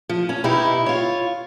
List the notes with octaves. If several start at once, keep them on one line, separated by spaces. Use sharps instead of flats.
F3
C#4
B2 D#4 E4 G4
F4 C#5